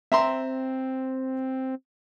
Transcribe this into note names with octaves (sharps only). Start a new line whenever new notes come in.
C4 E5 A#5 C6